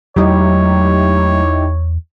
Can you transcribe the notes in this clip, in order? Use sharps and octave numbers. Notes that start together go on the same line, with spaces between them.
E2 F#3 G#3 A3 D#4 E4 G4 C#5